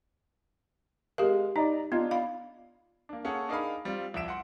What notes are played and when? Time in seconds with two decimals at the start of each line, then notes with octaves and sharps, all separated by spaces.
1.18 G#3 G4 A#4 F5
1.56 D#4 D5 D#5 A#5
1.92 B3 D4 D#4 F4
2.11 F5 B5
3.09 A#3 D4
3.24 A#3 C#4 G#4 A4 F#5
3.49 D4 D#4 G#4 A#4 F5 B5
3.85 G3 C4 F4
4.14 C2 F2 E5 D7 E7
4.28 F#5 C6